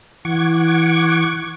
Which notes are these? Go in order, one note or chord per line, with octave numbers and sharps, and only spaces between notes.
E3 F#5 C#6 D6 G#6